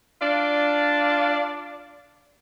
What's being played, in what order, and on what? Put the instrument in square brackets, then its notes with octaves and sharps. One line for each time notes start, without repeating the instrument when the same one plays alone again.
[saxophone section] D4 F4 D5